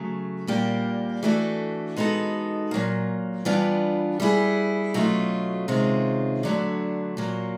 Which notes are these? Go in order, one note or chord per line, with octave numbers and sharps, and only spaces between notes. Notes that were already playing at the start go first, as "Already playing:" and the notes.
Already playing: C#3 F#3 A3
A#2 G3 A#3 D4 G4
E3 A3 D4 F#4 A4
G#3 B3 D#4 F#4 A4
A#2 F#3 A#3
E3 G3 B3 D4 F4
G3 B3 E4 G#4
B2 F#3 A3 C#4 F4
C3 D#3 G#3 C#4 F4
D3 F#3 A3 D4
A#2 F#3 A#3